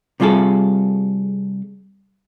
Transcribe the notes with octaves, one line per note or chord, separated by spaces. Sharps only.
C3 G3 F4 G#4 A4